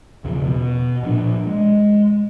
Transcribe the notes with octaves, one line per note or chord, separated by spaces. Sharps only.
B1 E2 C#3 F3
B2
A#2 F3 D4
G#3